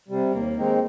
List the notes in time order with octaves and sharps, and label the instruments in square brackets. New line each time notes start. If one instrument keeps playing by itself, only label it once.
[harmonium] C3 G3
[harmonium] D#2 [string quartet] A#3
[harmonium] D#3 G#3 C4 D#4